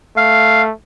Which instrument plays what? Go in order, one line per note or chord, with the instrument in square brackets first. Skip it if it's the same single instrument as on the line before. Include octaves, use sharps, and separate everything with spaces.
[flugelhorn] A3 [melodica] F5